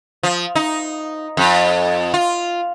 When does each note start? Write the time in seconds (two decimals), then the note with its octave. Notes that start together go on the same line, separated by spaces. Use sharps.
0.23 F3
0.55 D#4
1.37 F2
2.14 F4